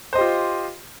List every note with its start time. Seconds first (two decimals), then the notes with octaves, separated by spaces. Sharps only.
0.13 C5
0.15 D#5
0.18 G4
0.21 F4